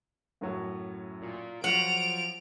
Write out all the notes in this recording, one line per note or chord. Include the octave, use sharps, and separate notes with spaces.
F#2 A2 F#3
A#2
F3 F#3 F#5 D7 F7